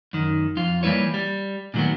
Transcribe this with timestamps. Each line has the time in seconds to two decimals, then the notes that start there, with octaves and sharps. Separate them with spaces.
0.13 F#2 D#3
0.57 F2 F4
0.83 E3 G3 A#3 E4 B4 C#5
1.14 G3
1.74 A#2 D#3 F#3 A3 B3